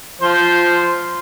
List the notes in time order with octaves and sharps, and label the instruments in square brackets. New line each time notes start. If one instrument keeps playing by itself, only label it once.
[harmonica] F3 C5